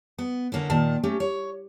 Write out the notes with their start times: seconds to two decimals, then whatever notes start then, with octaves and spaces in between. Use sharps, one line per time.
0.18 B3
0.52 D3 A#3 C#4 E4
0.70 A#2 D#3 A5
1.03 A3 C#4 G4
1.20 C#5